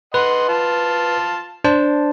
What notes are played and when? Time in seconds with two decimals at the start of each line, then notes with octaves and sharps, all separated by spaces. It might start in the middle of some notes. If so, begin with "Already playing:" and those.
0.14 B4 D#5 F#5 C6
0.49 F4 A5
1.64 D4 C5 A5